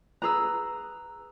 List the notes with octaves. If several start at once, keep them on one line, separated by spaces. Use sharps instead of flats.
G#4 B4 A#5 E6 F#6